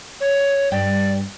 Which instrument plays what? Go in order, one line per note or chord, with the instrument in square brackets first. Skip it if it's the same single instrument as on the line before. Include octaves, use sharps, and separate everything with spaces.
[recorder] C#5
[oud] G2 G4 [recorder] D5